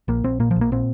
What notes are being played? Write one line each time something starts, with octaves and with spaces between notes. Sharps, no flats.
A#1 A#3
A#1 C4
A#2 A#3
F3
A#1
A#3
A#2 C4